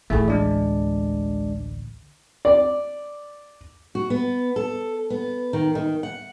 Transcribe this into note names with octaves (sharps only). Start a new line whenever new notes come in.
A1 D2 A3 E4 G#4
G#3 D4 D5
D5
F#4
B3
A4
B3
D#3
D#3
F#5